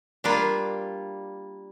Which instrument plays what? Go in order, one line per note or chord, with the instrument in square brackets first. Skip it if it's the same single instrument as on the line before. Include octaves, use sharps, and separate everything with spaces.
[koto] G3 A#3 D4 F4